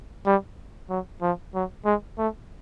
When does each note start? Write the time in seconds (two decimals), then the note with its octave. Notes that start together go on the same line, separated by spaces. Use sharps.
0.26 G3
0.89 F#3
1.22 F3
1.54 F#3
1.85 G#3
2.18 A3